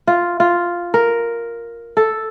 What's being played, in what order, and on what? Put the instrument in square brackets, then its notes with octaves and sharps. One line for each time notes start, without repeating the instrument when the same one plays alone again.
[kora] F4
F4
A#4
A4